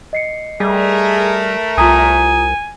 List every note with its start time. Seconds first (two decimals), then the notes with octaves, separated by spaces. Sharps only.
0.13 D#5 C7 C#7
0.60 G3 A3 G#4 A#4
1.78 C2 F4 G#5 A#5 D#6